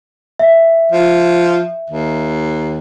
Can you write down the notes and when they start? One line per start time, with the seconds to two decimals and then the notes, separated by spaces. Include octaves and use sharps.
0.39 E5
0.92 F3
1.90 D#2